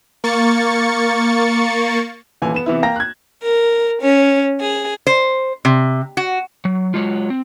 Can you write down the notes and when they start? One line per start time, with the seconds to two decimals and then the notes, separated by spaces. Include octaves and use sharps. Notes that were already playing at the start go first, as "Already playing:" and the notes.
0.24 A#3 C#6 A6 C#7
2.42 D#1 A#2 E3 G#5
2.54 B3 E7
2.66 C3 E3 B3 E4
2.83 A#3 F5 G5 A#5 A#6
2.96 F#6 G#6
3.43 A#4
4.02 C#4
4.61 G#4
5.07 C5
5.65 C3
6.17 F#4
6.65 F#3
6.94 F#3 G#3 F4
7.30 C4